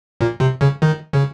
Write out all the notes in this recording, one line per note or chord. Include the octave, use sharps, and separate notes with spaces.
A#2
C3
C#3
D#3
C#3